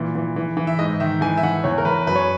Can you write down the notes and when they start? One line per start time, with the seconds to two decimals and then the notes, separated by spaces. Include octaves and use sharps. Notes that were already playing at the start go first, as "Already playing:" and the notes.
Already playing: A#2 E3
0.15 E3
0.36 E3
0.57 E3
0.67 E5
0.79 G#2 D#5
1.00 D#3 E5
1.21 E3 G#5
1.37 E5
1.43 E3 F#5
1.64 E2 C#5
1.78 A#4
1.85 E2 B4
2.07 F#2 B4
2.16 C#5